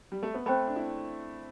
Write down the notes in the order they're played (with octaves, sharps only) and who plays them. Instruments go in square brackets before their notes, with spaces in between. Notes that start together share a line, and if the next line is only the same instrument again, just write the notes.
[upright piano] G3
A3
B3
[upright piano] A3 C4 [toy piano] C5 G5 B5
[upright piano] D4
C4 E4